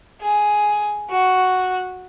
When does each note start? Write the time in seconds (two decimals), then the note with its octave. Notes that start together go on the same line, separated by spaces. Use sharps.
0.21 G#4
1.10 F#4